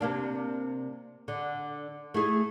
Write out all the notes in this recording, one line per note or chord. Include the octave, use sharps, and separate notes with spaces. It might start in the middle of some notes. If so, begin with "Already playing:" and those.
C3 A#3 D4
D3
A3 E4 G#4